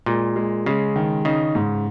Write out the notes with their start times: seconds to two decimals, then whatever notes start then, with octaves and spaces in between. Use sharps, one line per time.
0.06 A#2 G#3
0.36 G#3
0.66 C#3 G#3
0.96 D#3
1.25 C#3 D#4
1.55 G#2